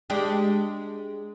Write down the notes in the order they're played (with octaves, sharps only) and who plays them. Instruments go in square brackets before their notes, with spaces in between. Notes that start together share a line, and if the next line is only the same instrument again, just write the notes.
[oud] G#3 D4 G4